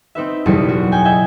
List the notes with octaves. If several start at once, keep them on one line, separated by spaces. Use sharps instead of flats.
C4 D#4 B4 E5
F#1 B1 E2 G3 D#6 C#7
F#4
G5 G#5 G6
D#5 E5 G5 G6 G#6